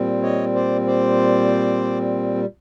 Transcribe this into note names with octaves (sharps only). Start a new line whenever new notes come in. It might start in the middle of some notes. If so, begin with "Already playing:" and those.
Already playing: A#2 G3 C4
C#5 D#5
C5 D5
C5 D5